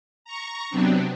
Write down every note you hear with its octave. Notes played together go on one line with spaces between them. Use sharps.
A#5 C#6
C3 F#3 B3 C4 D4